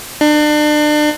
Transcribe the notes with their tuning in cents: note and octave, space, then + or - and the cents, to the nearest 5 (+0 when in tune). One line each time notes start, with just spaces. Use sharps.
D4 +35